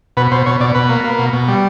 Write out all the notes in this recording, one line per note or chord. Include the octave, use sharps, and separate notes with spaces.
B2 B4
B2 C5
B2 C#5
B2 D5
B2 B4
A#3
A#3
B2
B2
G3